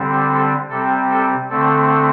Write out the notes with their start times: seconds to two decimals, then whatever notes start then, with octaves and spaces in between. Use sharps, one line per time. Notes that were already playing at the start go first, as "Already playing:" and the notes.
Already playing: D3 G3 C4
0.29 A4
0.69 C3 G3 C4 A4
1.09 A4
1.49 D3 A3 C4 A4